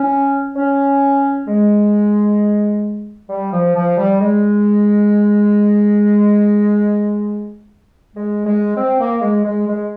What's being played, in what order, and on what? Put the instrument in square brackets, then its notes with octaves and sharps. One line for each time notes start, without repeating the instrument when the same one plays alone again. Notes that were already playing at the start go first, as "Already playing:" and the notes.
Already playing: [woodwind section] C#4
C#4
G#3
G3
F3
F3
G3
G#3
G#3
G#3
C4
A#3
G#3
G#3
G#3